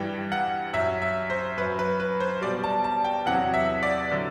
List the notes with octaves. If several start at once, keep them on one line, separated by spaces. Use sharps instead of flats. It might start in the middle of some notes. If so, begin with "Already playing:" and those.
Already playing: G2 E3 G3 G5
F#5
F#2 F#3 E5
E5
C5
F#2 F#3 B4
B4
B4
C5
B2 G3 D5
A5
A5
G5
E2 C3 F#3 F#5
E5
D5
D3 F#3